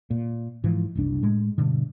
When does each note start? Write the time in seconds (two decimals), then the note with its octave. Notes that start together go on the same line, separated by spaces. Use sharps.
0.11 A#2
0.64 G#2 E3 F3
0.95 F#1 C2 D4
1.23 A2 G#3
1.58 G2 B2 D3